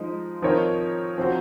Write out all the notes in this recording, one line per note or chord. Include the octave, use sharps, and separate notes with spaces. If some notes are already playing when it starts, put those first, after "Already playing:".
Already playing: F3 G#3 D#4
F3 C4 D#4 A#4 C#5
F3 C4 F#4 C5